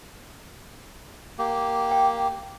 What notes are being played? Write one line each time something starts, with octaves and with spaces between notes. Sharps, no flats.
A#3 G4
G5